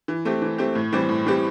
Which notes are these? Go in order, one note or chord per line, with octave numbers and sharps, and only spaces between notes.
E3
A3 C4 G4
E3
A3 C4 G4
A2
E3 G3 C4 G4
A2
E3 G3 C4 G4